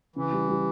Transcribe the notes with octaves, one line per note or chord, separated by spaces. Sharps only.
C#3 E3
G3
G3